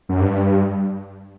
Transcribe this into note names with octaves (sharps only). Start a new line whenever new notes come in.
F#2
G2